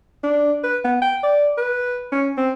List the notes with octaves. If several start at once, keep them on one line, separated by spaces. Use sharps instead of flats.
D4
B4
B3
G5
D5
B4
C#4
C4